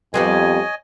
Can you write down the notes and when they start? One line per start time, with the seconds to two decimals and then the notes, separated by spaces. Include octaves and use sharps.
0.14 F2 G3 B3 C4 C#5 D#5 G#5